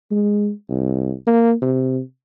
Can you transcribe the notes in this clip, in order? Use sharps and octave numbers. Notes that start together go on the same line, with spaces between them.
G#3
C2
A#3
C3